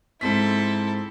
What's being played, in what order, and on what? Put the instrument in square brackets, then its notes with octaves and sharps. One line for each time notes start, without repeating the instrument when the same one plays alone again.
[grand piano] G#2 C4 B6 [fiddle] E4 A4